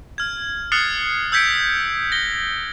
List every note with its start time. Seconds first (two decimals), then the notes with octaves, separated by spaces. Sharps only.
0.18 F6 G#6
0.72 D#6 F6 F#6 A6 C7 C#7
1.32 E6 G6 G#6 B6 C#7 D7
2.12 A#6 G7